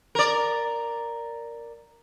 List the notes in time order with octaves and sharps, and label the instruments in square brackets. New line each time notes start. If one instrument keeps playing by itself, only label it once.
[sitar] A#4 D5